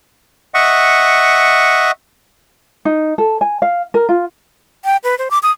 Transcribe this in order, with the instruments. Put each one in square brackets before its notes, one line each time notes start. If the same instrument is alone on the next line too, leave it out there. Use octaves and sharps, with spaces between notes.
[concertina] D#5 E5 F#5 C#6
[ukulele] D#4
A4
G#5
F5
A#4
F4
[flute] G5
B4
C5
D6
D#6